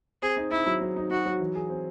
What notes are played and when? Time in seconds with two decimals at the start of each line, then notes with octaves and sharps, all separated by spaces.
0.22 C4 G#4
0.37 D#4
0.51 D#4 E4
0.66 F#3
0.81 F#3
0.96 D#4
1.10 D#4 F#4
1.26 F#3
1.40 E3
1.55 G#4
1.70 C4